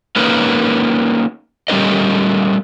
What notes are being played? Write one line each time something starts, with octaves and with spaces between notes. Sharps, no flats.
A#3 C#4 D#4 A#4 B4
G3 A3 C#4 A#4 B4 D#5